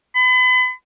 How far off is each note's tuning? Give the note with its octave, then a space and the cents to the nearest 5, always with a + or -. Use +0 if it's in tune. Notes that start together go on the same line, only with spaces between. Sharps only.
B5 +40